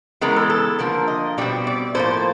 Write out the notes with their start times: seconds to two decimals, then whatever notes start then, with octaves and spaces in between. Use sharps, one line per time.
0.21 C#3 E3 G#3 B3 A#4
0.36 A4
0.50 A4
0.79 D3 F3 A#3 A#4
1.08 D#5
1.38 B2 G3 C4 D5
1.67 D5
1.95 A2 F3 A#3 C5